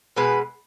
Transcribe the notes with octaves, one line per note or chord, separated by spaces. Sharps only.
B2 G#3 B4